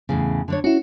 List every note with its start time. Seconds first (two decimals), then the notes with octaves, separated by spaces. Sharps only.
0.09 E2 A2 C#3
0.48 D3 D4 C#5
0.64 C#4 E4 F#4